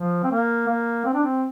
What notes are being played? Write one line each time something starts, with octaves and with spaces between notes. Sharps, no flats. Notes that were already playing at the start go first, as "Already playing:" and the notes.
Already playing: F3
C4
A#3
A#3
C4
D4
C4